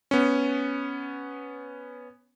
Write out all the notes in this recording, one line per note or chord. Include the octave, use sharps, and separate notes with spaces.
B3 C#4